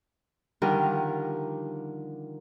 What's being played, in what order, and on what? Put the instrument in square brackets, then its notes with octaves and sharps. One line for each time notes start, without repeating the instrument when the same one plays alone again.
[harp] D3 D#3 F3 G3 G4 A#4